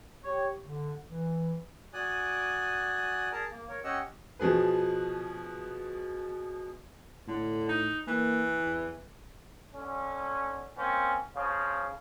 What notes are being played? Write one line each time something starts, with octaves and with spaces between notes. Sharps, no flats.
G4 C#5
D3
E3
F#4 D5 G#5 D#6 F#6
G#4 A#4 A5 A#5
A#3
A#4 C#5
C#4 G4 C#5 D#5 F#5 E6
B2 F3 G#4 B4
A2 D3
D#4
E3 A#3
E2
D3 C#4
A#3 C4 C#4
C#3 F3